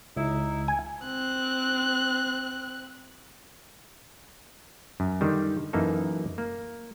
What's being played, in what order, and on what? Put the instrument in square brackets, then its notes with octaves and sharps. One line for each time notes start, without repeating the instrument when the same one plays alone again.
[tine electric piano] C#2 [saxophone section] D#4 E4
[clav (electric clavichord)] G#5
[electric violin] C4 F#6
[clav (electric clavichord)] F#2
D3 D#3 G3
F#2 E3 A#3 D#4 A4
A#3